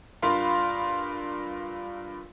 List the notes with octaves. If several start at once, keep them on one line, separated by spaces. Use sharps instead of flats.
G2 F4 A#4 F5 B5 C6